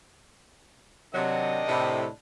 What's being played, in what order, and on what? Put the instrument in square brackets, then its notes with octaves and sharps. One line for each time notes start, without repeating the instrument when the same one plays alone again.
[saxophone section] C3 F#3 [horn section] D#3 D4 D#5
[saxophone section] A2 C3